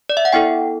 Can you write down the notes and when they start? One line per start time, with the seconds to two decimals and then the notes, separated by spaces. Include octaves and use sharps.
0.09 D5
0.17 E5
0.25 F#5
0.32 B3 E4 A4 G5